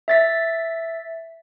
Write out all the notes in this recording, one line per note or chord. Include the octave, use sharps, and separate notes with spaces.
E5 A6 B6